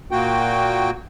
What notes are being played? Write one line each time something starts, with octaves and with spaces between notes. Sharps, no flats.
A#2 A#3 F#4 G5